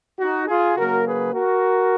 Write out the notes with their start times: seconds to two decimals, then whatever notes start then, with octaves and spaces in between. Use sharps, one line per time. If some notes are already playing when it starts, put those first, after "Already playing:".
0.19 D#4 F#4
0.47 F4 G#4
0.75 C#3 F#3 A#3 F#4 A#4
1.04 G#4 B4
1.33 F#4 A#4